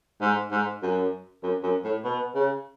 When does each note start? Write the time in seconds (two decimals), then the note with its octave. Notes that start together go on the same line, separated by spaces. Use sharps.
0.21 G#2
0.52 G#2
0.83 F#2
1.43 F#2
1.63 F#2
1.84 A2
2.04 B2
2.35 C#3